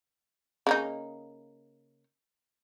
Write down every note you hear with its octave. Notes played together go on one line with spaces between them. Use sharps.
C#3 A#3 D#4